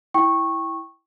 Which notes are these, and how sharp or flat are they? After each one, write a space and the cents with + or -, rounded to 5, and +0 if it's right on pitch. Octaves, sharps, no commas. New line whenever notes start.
E4 +0 G5 +0 C#6 -15